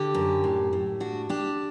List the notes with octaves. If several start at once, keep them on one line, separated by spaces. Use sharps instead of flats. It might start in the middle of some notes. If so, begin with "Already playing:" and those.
Already playing: D3 G4
F#2
A2
A2
D4 F#4
D4 G4